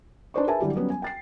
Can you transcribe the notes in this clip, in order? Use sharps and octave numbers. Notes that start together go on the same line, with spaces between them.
D4 D#4 B4 C5 D5 C#6
G#4 A#4 B4 E5 G#5 A5
D3 F#3 G3 E4 G4
F#3 G3 B3 C#4
G#5
G5 A6 C7